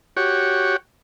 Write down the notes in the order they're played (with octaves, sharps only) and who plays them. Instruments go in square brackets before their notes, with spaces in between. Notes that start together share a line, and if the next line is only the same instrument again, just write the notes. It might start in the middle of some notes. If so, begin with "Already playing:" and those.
[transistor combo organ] F#4 G4 C#5